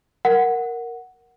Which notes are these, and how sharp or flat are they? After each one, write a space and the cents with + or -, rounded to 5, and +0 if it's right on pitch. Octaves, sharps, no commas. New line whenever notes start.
A#4 +0 F#5 +0